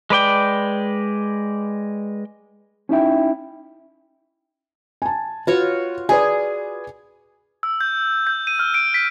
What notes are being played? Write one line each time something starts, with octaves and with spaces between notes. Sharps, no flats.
G#3 B4 D5 G5
C#4 D#4 E4 G5
G#5 A5
F4 F#4 B4 C#5
G#4 B4 D5 G#5
E6
G6
G6
D#7
F6
D7
B6